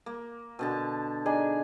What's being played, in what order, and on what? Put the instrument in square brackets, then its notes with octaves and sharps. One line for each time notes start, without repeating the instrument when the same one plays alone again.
[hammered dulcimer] A#3
B2 D3 A5
[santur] D4 D#4 G#4 [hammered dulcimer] G#5